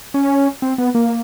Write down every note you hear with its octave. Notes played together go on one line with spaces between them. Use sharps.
C#4
C4
B3
A#3